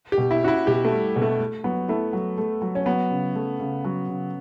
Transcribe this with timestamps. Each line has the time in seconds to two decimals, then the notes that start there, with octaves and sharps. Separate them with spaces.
0.12 G4
0.18 B2
0.31 E4
0.42 C#4 F#4
0.48 E4
0.67 B2 G4
0.85 A3
0.91 G3
1.16 B2
1.22 A3
1.40 A3
1.64 F#3 B3
1.88 A3 E4
2.13 F#3
2.38 A3
2.62 F#3
2.75 C#4
2.86 F#3 B3
3.11 C#3
3.35 A3
3.60 C#3
3.84 F#3
4.08 C#3